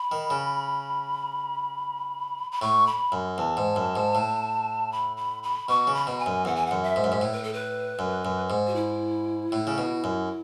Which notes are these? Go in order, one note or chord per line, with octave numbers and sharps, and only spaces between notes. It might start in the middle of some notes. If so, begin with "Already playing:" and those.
Already playing: B5
D#3
C#3
B5
A2 C#6
B5
F#2
E2 A5
G#2
F#2
G#2
A2
B5
B5
B5
B2 C#6
C#3
B5
B2
G#5
F#2
E2 F#5
G#5
F#5
F#2
E5
G#2
F#2
G#2
A2 C#5
B4
A4
B4
F#2
F#2
G#2
F#4
E4
A2
C#3
B2
F#2